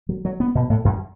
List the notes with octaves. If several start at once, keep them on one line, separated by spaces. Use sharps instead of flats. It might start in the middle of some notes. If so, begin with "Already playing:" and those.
F#3
F#3
B3
B2
A2
F#2